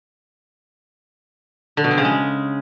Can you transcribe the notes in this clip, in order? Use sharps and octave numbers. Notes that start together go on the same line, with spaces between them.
D3
B2
C4
C#3
G#3